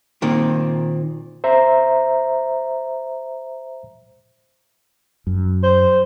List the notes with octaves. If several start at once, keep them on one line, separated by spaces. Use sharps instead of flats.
A#2 D#3 C4
C5 E5 A#5
F#2
C5